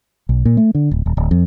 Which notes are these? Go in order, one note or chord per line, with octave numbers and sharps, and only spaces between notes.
B1
A#2
A3
D3
D1
D#1
D1
F2